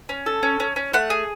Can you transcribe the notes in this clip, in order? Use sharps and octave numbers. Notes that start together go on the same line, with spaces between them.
C#4
A4
C#4
C#4
C#4
A3 F#5
G#4